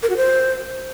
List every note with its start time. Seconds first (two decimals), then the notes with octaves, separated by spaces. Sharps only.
0.03 A#4
0.10 F#4
0.17 C5